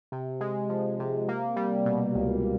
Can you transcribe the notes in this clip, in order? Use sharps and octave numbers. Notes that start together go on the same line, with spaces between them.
C3
G#3
F3
C3
A#3
G3
B2
C#2